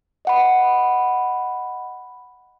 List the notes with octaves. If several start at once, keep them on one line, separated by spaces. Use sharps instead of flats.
D#5 F#5 B5